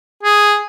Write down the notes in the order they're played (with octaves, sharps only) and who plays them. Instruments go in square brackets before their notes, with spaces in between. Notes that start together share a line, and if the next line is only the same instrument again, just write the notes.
[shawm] G#4